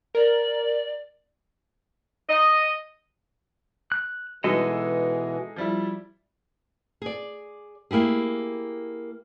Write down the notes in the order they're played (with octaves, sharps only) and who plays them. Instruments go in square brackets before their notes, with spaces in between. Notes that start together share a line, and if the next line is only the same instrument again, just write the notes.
[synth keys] A#4 [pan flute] D5
[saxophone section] D#5
[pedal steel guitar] F#6
[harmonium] B2 E3 [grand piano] G#3 D#4 [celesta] F#4 [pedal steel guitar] A4 D#5
[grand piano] F3 G3 E4
[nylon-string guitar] G#4 D5
A#3 E4 G4 G#4